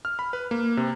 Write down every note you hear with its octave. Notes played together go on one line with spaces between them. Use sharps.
F6
B5
B4
A#3
C3